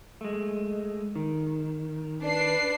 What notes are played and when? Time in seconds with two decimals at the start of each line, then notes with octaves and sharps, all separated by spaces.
0.21 G#3 A3
1.16 D#3
2.24 D4 B4 C7